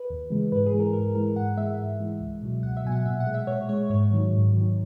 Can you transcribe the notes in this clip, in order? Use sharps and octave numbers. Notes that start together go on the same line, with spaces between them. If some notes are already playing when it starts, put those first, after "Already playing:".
Already playing: B4
D#2
C#3 E3 G#3
G#2 B4
G#4
E3 G#3
A#4
G#2 A#4
E3 G#3 A#4
G#2 F#5
E3 G#3 E5
G#2
E3 G#3
C#2
B2 F#3
C#2 F#5
E5
B2 F#3 G#5
F#5
A#2 E5
F#5
G#3
E5
A#2 C#5
G#3 C#5
G#2 C#5
D#3 F#3
G#2
D#3 F#3